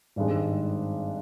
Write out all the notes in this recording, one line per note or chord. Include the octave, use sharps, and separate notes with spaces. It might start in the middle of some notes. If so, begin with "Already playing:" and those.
G#1 G2 D#3 G#3